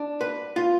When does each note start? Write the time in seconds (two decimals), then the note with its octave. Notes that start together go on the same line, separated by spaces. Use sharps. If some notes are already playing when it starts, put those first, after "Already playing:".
Already playing: D4
0.21 B4
0.56 F4